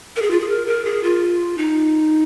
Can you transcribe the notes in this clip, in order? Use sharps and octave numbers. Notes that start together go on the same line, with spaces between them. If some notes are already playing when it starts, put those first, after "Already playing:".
A#4
G#4
F4
G#4
A#4
A#4
G#4
F4
D#4